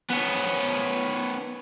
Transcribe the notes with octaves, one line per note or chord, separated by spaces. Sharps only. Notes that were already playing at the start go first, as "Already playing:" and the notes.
B3 C#4